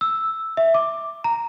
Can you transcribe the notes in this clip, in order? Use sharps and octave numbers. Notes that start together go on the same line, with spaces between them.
E6
E5
D6
A#5